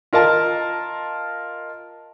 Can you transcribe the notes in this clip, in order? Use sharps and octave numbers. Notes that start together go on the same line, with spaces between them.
F4 A#4 D#5 A5